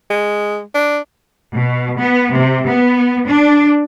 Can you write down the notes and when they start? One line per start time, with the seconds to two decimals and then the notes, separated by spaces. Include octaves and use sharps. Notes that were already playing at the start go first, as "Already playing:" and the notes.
0.10 G#3
0.75 D4
1.57 B2
2.02 B3
2.38 C3
2.70 B3
3.30 D4